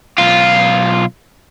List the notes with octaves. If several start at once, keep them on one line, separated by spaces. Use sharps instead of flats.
B1 F4